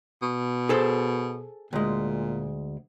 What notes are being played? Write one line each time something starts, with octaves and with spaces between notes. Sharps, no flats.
B2
G#4 A4 C5
D2 A#2 G#3